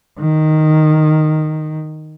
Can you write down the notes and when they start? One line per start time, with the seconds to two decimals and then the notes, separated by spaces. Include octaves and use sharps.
0.20 D#3